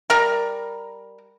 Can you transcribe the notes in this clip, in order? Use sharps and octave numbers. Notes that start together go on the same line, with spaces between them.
G3 A#4 A#5